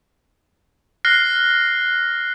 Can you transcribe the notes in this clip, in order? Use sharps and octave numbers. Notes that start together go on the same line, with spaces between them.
F6 F#6 A#6 C7